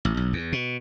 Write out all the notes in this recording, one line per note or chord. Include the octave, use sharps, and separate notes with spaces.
A1
B1
E2
B2